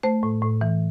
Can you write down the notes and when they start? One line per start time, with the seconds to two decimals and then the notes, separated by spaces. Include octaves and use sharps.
0.03 A3 C5
0.23 A2
0.42 A2
0.61 E3